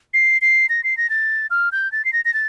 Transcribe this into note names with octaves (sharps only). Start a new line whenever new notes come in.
C7
C7
A#6
C7
A#6
A6
F6
G6
A6
C7
A#6
A#6
A6